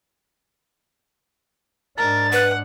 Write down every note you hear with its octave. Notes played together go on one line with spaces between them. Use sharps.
G#2 D4 A#4 A6
B4 F#5